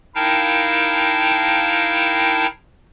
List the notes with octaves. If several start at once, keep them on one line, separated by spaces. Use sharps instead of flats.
D#4 E4 A#4 F5 G5 A5